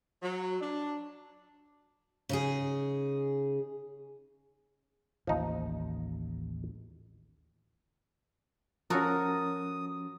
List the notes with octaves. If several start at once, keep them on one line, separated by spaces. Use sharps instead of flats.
F#3
D4
C#3 D#4 G#4
A1 D#2 F3 D#4
F3 C#4 F#4 A4 A#4 D#6